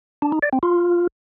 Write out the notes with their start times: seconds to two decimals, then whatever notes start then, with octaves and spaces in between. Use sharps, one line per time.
0.22 D4
0.32 D#4
0.42 D5
0.53 C4
0.63 F4